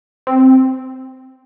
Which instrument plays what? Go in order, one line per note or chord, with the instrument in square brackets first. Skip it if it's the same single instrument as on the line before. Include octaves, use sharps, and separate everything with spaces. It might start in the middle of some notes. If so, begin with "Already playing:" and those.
[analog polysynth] C4